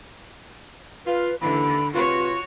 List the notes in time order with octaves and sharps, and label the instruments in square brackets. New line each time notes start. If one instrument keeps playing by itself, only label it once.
[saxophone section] F4 [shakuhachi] B4
[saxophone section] D#2 E3 [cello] D3 [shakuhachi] B5
[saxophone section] C3 B4 [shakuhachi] F4 [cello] F#4 C#5